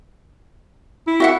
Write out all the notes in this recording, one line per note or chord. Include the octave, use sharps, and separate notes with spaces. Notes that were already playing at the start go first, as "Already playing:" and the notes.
E4
F#4 E5 F#5